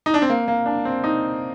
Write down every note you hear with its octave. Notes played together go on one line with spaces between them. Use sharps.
D#4
D4
C4
A#3
A#3
D4
C4
D#4